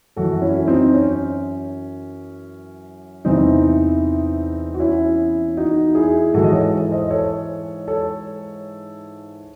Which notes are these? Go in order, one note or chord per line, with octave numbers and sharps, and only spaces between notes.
F#2 E3 F#4 A4
C#4 E4
C4 D#4
C#4
E2 C3 E3 C4 D#4
F#4
C#4 E4
D#4 F#4
E4 G#4
G#2 E3 F#4 A4
D#5
A4 C#5
C5 D#5
A4 C#5
A4 C#5